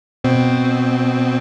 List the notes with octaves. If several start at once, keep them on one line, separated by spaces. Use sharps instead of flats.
B2 C4